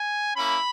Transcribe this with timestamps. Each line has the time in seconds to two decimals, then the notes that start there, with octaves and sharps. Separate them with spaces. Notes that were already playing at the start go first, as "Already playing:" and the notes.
Already playing: G#5
0.36 A#3 C#4 E4 B5